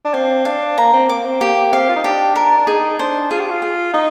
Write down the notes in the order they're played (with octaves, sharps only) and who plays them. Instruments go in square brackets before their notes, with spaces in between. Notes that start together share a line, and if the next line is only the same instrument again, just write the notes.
[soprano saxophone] D4
[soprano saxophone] C4 [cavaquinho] F5
[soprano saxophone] D4 [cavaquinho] F5
[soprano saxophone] A#3 [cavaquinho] A#5
[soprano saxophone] C4
[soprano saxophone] A#3 [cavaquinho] D6
[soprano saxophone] C4
[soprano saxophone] A#3 [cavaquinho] G4
[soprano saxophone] C4 [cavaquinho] F5
[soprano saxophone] F4
D#4
[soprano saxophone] D4 [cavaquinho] G4
[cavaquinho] A#4
[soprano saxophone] D4
[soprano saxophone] D#4 [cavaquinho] G#4
[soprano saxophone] D4 [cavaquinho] C5
[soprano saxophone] F4 [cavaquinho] G#4
[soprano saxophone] G4
F4
[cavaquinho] G#4
[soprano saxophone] D#4 [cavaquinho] D#5